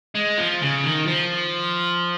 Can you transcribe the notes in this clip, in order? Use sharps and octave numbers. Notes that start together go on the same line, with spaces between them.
G#3
F3
C#3
D#3
F3